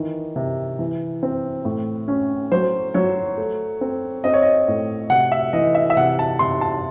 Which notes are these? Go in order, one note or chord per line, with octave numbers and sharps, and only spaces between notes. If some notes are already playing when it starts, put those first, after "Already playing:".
Already playing: D#3 E3
C3
E3
C4
A2
C#4
F#3 C5
F#3 C#5
A3
C4
C4 D#5
C#5
D#5
A2
C3 F#5
E5
E3 D#5
E5
E5
C3 F#5
A5
C3 C6
A5